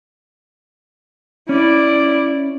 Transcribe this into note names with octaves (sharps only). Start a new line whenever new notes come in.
C#4 E4 D5